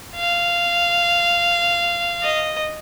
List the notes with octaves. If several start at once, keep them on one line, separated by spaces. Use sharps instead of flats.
F5
D#5